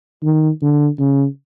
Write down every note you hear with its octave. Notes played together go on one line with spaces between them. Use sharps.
D#3
D3
C#3